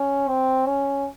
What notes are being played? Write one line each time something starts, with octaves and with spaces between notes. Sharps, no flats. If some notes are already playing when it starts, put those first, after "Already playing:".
Already playing: C#4
C4
C#4